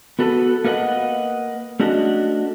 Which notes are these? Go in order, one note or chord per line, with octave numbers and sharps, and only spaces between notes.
B3 F#4 A4 B4
A#3 A#4 B4 D#5 F#5
A3 C#4 D4 F#4 D#5